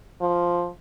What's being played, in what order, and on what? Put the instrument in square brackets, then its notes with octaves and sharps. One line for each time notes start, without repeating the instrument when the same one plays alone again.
[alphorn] F3